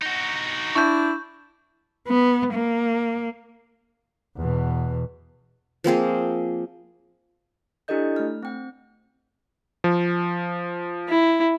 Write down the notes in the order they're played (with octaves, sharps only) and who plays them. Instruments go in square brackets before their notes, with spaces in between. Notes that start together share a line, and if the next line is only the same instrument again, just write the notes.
[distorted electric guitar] D#4 F#4
[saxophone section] D4 E4 [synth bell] C#6 G6
[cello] B3
A#3
[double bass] E2 B2
[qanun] F3 A#3 C4 G#4
[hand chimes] D4 E4 G4 A4 D#5 G6
A3 F6
C4 G5
[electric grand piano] F3
[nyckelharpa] E4